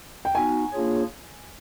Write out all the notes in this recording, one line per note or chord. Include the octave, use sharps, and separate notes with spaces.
G5
B3 D#4 F#4 G#5
A#3 D4 F4 G#4 C#5